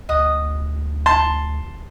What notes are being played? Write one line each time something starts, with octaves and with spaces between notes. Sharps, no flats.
D2 D#5 F#5 D#6
A5 C6